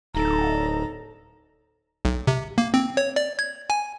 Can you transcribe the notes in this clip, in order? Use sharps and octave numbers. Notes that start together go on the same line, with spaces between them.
D1 D#4 A4 A#5
B1
C3
A#3
C4
C#5
D5
G#6
G#5